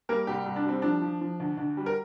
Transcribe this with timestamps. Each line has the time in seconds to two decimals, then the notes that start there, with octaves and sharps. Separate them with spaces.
0.09 G3 A#3 A#4
0.27 C2 G3 G4
0.46 C2
0.56 D4
0.65 G3 C4
0.82 F3 D4
1.02 F3
1.21 F3
1.40 D2
1.57 D2
1.77 G3
1.86 A#4